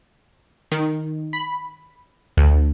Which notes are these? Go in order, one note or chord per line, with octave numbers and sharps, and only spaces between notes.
D#3
B5
D2